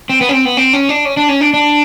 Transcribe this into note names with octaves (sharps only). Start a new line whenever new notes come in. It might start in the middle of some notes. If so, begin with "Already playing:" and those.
C4
B3
C#4
C4
B3
C4
C#4
D4
C#4
D4
C#4
D4
D4